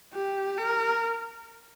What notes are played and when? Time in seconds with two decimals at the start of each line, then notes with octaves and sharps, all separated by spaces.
0.13 G4
0.58 A#4